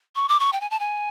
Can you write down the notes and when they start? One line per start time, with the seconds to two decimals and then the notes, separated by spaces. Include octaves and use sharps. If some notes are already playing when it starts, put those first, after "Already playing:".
0.16 C#6
0.29 D6
0.40 C#6
0.53 G5
0.61 G#5
0.71 A5
0.80 G#5